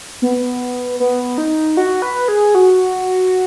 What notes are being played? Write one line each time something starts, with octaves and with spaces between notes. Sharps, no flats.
B3
B3
D#4
F#4
B4
G#4
F#4